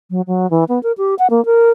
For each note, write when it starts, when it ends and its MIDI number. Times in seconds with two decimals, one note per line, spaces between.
0.11 0.21 54
0.27 0.49 54
0.51 0.64 52
0.68 0.81 59
0.83 0.92 70
0.98 1.15 67
1.19 1.27 78
1.30 1.44 58
1.45 1.70 70